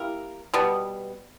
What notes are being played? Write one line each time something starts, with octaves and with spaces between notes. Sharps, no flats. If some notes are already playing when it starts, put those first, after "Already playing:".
Already playing: A#3 E4 G4 A#4
B2 G3 B3